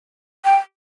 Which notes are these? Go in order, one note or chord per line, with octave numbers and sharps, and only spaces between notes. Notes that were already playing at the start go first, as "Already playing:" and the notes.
G5